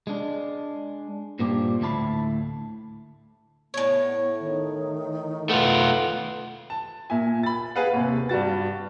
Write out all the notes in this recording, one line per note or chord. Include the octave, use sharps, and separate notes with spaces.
G#3 D4
G2 A#2 A#3 C4 D4 G4
D2 A2 E4 A#4 A5 B5
A2 B3 C#5
D#3
A3 B3 F4
A5
A#2 E5 G#5
B5 A6
G#4 B4 F5 F#5
D#2 C3
G2 G3 F#4 A6